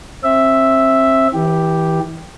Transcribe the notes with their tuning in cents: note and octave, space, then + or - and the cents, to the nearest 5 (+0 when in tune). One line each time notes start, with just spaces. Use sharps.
C4 +30 E5 +0
E3 -25 G4 +0